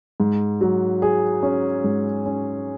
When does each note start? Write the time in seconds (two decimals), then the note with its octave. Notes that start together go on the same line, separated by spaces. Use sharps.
0.20 G#2
0.61 F#3
1.02 G#4
1.43 C#4
1.84 G#2
2.26 C#4